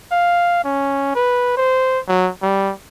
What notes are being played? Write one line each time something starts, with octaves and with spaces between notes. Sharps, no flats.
F5
C#4
B4
C5
F#3
G3